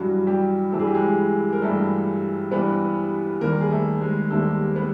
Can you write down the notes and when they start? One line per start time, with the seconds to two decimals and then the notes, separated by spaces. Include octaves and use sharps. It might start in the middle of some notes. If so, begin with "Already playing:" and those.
Already playing: G2 E3 F#3 G3 F#4
0.27 G3 G4
0.72 G2 E3 G3 A4
0.79 G#4
0.87 G4
0.94 G#3 G#4
1.53 A#4
1.62 G2 E3 G3 A3 A4
2.51 G2 E3 G3 B3 B4
3.41 D#2 D#3 G3 A#3 A#4
3.61 G#4
3.71 A3 A4
4.01 G#3 G#4
4.30 D#2 D#3 G3 A3 A#3 A4
4.76 B3 B4